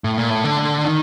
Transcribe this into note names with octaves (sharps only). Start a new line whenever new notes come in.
A2
A#2
A2
D3
D#3